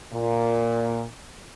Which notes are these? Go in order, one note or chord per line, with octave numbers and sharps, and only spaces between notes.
A#2